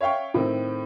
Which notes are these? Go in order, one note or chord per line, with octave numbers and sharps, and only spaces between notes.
C#5 E5 F5 G5 C#6
A2 D#3 C4